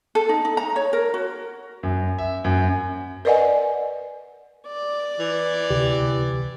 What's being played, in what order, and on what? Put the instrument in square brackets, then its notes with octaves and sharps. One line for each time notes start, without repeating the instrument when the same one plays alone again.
[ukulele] A4
D#4
D#4
A#5
C#5
A#4
F#4
[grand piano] F#2
E5
F#2
[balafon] A#4 B4 D5 D#5 F#5 G#5
[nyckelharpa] D5
[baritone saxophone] E3
[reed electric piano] D2 C3 G4